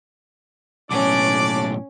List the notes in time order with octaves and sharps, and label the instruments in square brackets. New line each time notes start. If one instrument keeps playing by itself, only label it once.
[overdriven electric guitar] B1 A2 [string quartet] C#4 [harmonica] D4 D5 D6